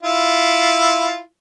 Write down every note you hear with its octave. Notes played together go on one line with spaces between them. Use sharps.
E4 F4